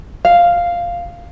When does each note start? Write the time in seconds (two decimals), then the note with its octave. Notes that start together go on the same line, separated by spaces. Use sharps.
0.25 F5